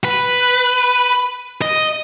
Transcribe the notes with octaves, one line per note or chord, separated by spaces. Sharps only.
B4
D#5